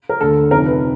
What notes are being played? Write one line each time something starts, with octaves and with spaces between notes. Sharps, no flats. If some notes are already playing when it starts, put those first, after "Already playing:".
A#4
D2 D3 A4
F2 C3 D#3 A#4
B4